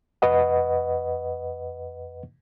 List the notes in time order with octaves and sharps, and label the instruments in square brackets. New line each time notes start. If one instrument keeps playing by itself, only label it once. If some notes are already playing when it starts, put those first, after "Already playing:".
[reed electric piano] F2 B4 D#5 F#5